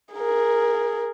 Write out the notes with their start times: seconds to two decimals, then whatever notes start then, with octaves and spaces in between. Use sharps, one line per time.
0.14 G#4 A#4